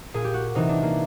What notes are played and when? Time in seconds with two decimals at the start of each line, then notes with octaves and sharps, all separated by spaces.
0.14 A#2 G#4
0.24 G4
0.34 F#4
0.55 C3 E3 D#4
0.69 D4
0.83 A#3